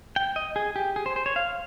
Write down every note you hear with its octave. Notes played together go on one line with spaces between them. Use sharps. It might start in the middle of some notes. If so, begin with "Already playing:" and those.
G5
D#5
G#4
G4
G#4
C5
C5
C#5
F5